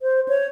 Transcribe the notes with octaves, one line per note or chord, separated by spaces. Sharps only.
C5
C#5